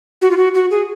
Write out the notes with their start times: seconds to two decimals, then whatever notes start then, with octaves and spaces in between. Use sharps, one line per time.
0.22 F#4
0.31 F4
0.37 F#4
0.55 F#4
0.71 G#4